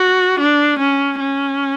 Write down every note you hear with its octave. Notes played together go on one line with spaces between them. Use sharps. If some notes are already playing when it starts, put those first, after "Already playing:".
Already playing: F#4
D4
C#4
C#4